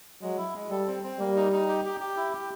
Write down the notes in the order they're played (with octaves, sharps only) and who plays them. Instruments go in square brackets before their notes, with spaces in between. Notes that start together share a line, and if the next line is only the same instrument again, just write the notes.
[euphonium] F#3 [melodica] G#3
[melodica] E4
G#3
[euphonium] G3 [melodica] A4
[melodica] C4
C4
[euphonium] G3 [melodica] A#3
[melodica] D#4
D#4
G4
G4
G4
E4
G4